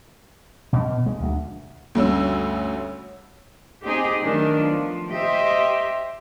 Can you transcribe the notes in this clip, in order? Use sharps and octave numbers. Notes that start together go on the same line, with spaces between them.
B2
G#3
D2
D2 G2 C#4 E6
C4 D#4 G4 G#4
D#3 F#3 A3 B3 D4
F3
G4 C5 D#5 E5